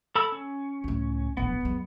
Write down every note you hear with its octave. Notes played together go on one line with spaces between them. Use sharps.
A4 B5 E6
C#4
C#2 A2
D1 A#1 B3
F#2 G#3